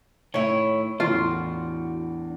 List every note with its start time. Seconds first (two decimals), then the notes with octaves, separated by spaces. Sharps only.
0.34 A2 D#3 E4 C#5
1.00 E2 A2 D4 F4 F#4 C6